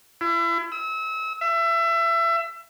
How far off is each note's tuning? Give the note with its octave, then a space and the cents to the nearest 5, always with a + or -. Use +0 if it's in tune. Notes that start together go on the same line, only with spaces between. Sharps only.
E4 +35
E6 -35
E5 +25